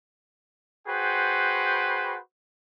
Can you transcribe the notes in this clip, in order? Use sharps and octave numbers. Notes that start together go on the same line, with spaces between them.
F#4 G#4 B4 C5 G5